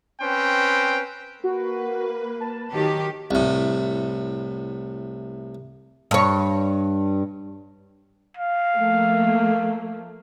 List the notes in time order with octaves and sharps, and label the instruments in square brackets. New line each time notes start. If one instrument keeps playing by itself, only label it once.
[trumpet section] C4 C#4 B4 C5 G5
[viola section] A#3 B4 [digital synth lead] F#4
[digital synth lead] A5
[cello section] D#3 G4 [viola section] F#3
[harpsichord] C2 A2
[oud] G2 C#5
[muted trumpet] F5
[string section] F3 A3 A#3